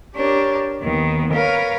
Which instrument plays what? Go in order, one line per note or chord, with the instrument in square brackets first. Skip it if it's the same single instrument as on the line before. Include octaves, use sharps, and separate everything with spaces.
[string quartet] D4 G4 A#4 C#5
D#2 D#3 B3
A#4 B4 C#5 F5